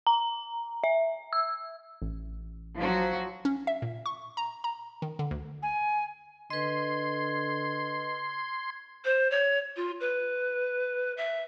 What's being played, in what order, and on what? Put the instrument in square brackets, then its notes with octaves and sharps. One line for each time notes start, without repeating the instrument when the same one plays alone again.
[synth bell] A#5
E5
E6
[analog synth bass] A1
[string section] F3 F#3 F#4
[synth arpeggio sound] C#4
E5
A#2
C#6
A#5
A#5
D#3
D3
D2
[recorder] G#5
[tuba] D3 [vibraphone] B4 D#5 [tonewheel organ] C6 [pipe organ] G#6
[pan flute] C5
C#5
F4
B4
E5